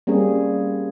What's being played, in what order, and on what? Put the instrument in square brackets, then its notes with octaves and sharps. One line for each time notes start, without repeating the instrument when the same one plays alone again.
[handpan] G3 A#3 C4 C#4 G#4